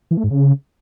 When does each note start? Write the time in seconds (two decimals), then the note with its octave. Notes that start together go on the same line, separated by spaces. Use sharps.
0.11 E3
0.17 A3
0.24 G#2
0.30 C#3